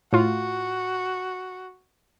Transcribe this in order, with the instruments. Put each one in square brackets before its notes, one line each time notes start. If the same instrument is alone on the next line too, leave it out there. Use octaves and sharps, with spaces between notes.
[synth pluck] A2 F4 [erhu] F#4